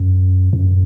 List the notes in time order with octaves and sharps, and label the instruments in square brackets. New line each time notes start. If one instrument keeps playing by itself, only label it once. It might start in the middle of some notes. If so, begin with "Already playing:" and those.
Already playing: [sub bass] F#2
F#2